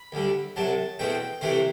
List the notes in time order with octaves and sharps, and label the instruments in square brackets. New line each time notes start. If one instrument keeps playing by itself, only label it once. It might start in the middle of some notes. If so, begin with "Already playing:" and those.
Already playing: [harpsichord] B5
D2 D3 G3
C2 C3 F#3 A5
E2 B2 A3 C4 G5
C2 C3 E3 A3 C4 C5